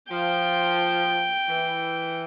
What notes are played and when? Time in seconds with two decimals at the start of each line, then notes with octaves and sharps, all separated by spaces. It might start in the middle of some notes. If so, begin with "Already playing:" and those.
0.11 F3 G5
1.49 E3